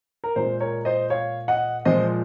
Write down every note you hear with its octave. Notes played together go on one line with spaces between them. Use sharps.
A#4
A#2 G#3 C5
A#4 C#5
C5 D#5
C#5 F5
D#5 F#5
A#2 F3 G#3 C5 D#5